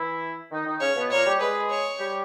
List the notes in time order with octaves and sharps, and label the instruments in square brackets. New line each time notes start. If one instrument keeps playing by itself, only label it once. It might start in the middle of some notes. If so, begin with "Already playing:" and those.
Already playing: [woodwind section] E3 E4
D#3 D#4
D#3 D#4
[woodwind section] C#3 C#4 [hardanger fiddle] C#5
[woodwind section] B2 B3
[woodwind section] A#2 A#3 [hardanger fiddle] C#5
[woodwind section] G3 G4
[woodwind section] G#3 G#4 [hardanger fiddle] B4
[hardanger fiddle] C#5
[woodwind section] G3 G4